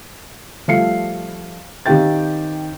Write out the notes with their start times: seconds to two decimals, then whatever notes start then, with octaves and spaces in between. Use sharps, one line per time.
0.68 F3 G3 A3 F5 C7 C#7
1.86 D#3 C4 G4 F5 G5 A6